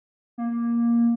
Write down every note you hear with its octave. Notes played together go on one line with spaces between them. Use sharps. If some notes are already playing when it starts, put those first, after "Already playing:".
A#3